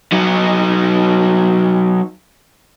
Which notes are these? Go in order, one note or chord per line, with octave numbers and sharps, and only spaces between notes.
F#3 D#4